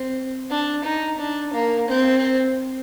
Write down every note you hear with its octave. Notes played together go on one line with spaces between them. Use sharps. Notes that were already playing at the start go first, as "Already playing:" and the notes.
Already playing: C4
D4
D#4
D4
A#3
C4